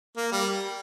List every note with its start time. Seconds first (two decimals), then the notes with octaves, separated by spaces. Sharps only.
0.17 A#3
0.32 G3